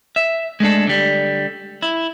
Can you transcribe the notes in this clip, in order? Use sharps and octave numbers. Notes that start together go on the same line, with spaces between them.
E5
G#3 A3 D4 A4
D3 G3
E4